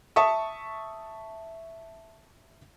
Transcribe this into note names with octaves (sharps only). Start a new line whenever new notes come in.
E5 A5 C#6 D#6